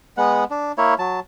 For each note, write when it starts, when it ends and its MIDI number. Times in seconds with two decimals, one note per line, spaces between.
0.17 0.44 56
0.17 0.44 59
0.17 0.44 78
0.51 0.72 62
0.78 0.94 58
0.78 0.94 64
0.78 0.94 73
0.99 1.20 54
0.99 1.20 81